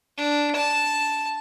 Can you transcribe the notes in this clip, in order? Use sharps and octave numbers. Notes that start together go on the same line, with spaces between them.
D4
A5